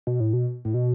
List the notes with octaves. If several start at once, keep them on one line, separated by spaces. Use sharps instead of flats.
B2
A2
B2
A2
B2